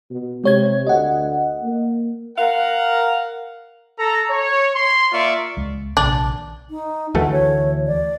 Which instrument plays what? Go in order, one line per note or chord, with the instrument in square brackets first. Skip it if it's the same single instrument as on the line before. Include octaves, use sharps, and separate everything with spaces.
[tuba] B2
[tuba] C3 [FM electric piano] G#3 C#5 G#6
[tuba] D2 [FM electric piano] D#5 F#5
[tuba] A#3
[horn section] A#4 F5 F#5
[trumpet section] A4 A#5
C#5
C6
A#3 F4 D5 E5 C#6
[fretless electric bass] C#2 G#3
[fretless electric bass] A#1 C3 D#3 [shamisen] D4
[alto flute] D#4
[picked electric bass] D2 E3 A3 [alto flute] F#4
[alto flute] C#5
D5